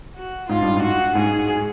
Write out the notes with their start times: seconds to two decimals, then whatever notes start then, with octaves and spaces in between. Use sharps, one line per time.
0.16 F#4
0.48 G#2 F4
0.62 G2
0.76 G#2
0.82 F#4
1.15 G#2 G#4